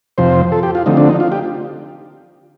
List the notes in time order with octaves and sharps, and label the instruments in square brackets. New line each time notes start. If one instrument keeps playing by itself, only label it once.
[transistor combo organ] F2 C3 F3 C5
A4
G4
F4
D3 F3 A3 C4 D#4
D4
D#4
F4
G4